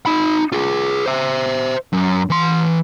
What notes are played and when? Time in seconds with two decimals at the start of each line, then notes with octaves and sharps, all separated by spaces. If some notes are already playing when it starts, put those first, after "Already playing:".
0.06 D#4 B5
0.52 F4 G#4
1.06 C5 E5
1.93 F#2
2.30 E3 C6